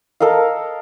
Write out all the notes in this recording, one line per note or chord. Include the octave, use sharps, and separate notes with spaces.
A4 A#4 D#5 F5